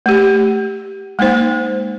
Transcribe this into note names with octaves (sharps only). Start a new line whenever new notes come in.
A3 G4
G#3 A#3 D#4 C5